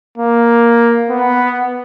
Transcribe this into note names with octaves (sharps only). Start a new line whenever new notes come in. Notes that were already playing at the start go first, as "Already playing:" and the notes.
A#3
B3